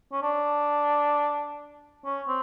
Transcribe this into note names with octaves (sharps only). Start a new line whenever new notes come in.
C#4
D4
C#4
C4